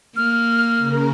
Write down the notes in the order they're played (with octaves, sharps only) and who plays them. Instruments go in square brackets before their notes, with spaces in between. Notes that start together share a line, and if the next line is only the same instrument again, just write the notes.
[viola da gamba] A#3 [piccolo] F6
[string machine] C#3 A#4